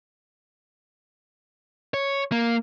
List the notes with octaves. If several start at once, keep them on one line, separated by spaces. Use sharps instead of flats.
C#5
A#3